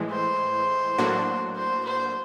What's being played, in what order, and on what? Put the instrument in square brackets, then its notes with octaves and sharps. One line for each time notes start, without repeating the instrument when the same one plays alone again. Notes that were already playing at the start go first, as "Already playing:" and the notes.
Already playing: [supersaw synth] A2 E3 G#3
[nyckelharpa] C5
[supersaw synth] A2 F#3 A#3 D4 F#4
[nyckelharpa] C5
C5